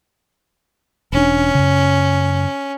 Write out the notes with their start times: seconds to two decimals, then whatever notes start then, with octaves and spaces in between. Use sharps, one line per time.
1.12 E1 C#4 D4
1.55 F#2 C#3